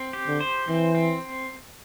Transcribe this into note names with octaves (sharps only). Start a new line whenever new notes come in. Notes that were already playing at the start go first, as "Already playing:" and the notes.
Already playing: C4
G4
D3
C5
E3 C4
C4